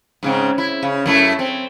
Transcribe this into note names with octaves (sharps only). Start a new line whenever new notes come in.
G#2 C#3 C4
E4
C#3
F#2 A3 E4
C4